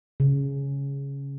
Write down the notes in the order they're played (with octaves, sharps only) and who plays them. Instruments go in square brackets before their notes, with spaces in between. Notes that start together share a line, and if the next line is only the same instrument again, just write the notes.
[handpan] C#3